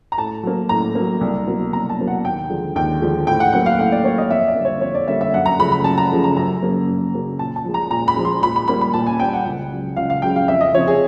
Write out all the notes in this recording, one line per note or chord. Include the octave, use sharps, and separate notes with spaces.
A#5
A2 A5
F#3 A#3
A2 A#5
F#3 A#3
C2
B2 F#3 A#3
C2 A#5
A5
B2 F#3 A#3
F#5
D#2 G5
D3 F3 G#3
D#2 G5
D3 F3 G#3
A2 G5
F#5
F#3 A#3 F#5
F5
A2 F#5
D5
F#3 A#3 C#5
D#5
F2 E5
D5
D3 G3 A#3
C#5
F2 C#5
D5
D3 G3 A#3 E5
E5
F#2 F#5
A#5
C#3 F3 A3 B5
B5
F#2 A5
A#5
C#3 F3 A3
A#5
F#2 A#5
C#3 F#3 A#3
F#2
C#3 F#3 A#3
A#2 A5
A5
F3 G#3
A#5
A#2 A#5
B5
F3 G#3
C6
A#2 B5
B5
G3 A#3 B5
B5
A#2 A5
G#5
G3 A#3 G5
F#5
C#2
C#3 F#3
C#2 F5
F5
C#3 F#3 G5
F5
F2 E5
D#5
C3 F3 C#5
G#4